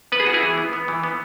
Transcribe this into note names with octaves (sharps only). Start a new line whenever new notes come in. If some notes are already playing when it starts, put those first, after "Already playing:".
B3 B4
G#4
B3 F#4
E4 G#4
E3
B3
B3
E3
B3